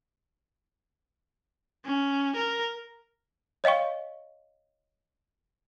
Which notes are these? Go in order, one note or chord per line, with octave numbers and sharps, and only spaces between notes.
C#4
A#4
C#5 D#5 F5 G5 C#6